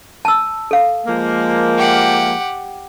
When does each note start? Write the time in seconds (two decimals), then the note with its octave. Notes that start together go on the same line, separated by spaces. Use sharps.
0.25 A5 E6
0.71 A4 F5
1.07 F3 G#3 A#3
1.78 G4 F#5